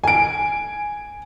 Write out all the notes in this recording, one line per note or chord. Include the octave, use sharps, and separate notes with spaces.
G#5 D7